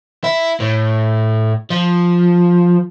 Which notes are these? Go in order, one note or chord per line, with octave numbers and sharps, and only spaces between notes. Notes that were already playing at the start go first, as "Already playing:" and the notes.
E4
A2
F3